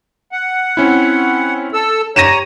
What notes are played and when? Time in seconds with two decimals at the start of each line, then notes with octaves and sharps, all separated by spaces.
0.32 F#5
0.77 C4 C#4 E4
1.74 A4 E6
2.16 G4 C#5 A#5 A#6 D#7 E7